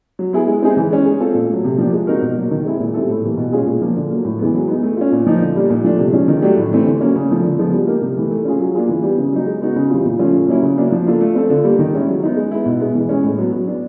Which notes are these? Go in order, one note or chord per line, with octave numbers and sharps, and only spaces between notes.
F#3
B3 E4 G#4
G#3
C4 D#4 G#4
E3
G#3 C#4
G#3
C4 F4 A4
A#2
F#3 A3
C3
F3 A#3 D4 G4
G#3
C4 D#4 F#4 A#4
B2
F#3 A#3
D#3
G#3 C4 E4 G#4
A#2
G3 C4 E4 A4
A2
E3 G3 A#3
B2
G#3 C#4 F4 G#4
A#2
F3 A#3
D3
F#3 A#3
A2
E3 G#3 B3
F#3
B3 D#4 G#4
A3
C#4 F4
A#2
F3 A#3 D#4
D3
G3 A#3 D4
A#2
F3 A3 D4
C3
F3 G#3 C#4
D#3
F#3 A3 D4 G4
A2
E3 A3 C4
D3
F#3 A#3 C#4
C#3
F3 A3
D3
F3 G#3 B3
G3
A#3 D#4 G4 A#4
C3
E3 A3
A3
C#4 F4 G#4
F#3
A#3 D4 F4 G#4
E3
G3 B3
C#3
F#3 A#3 D#4
G#3
B3 D#4 F#4
C#3
E3 G3 C4 F4
A#2
F3 A3 C#4 F4
C#3
F#3 A#3 C#4 E4
C#3
F#3 A#3 D4
F3
A#3 D4 F4 A4
A3
C4 F4 A4
D3
G3 A#3
D#3
G#3 C#4 E4
F#3
B3 D#4
G#3
B3 E4
B2
G#3 B3
E3
G#3 C#4
A2
F#3 B3
F#3
B3 D4